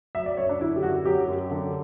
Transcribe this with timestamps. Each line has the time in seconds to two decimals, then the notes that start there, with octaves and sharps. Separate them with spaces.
0.15 F#3 E5
0.26 D5
0.37 F#2 C#5
0.49 D4
0.61 D3 E4
0.76 G4
0.82 F#2 F#4
1.05 F#3 G4
1.28 F#2
1.51 D3